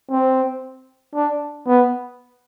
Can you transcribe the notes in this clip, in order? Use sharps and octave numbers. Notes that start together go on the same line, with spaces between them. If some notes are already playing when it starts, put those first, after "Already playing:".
C4
D4
B3